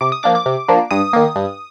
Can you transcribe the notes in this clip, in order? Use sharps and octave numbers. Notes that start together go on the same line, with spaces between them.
C3 D6
D#6
F3 A#3 D4 D6
D6
C3
F3 A#3 D4
G2 D#6
D#3 A#3
G2